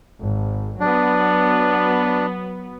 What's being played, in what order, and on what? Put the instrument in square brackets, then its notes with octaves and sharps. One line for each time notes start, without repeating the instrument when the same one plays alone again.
[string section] G#1
[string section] F#3 B3 [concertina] D4